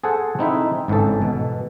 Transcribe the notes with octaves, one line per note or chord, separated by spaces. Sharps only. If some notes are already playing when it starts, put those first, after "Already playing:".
G#4 A4 C5 F#5 G#5
C4 D#4 E4 E5
G#1 G#2 C#3 E3 A4
B2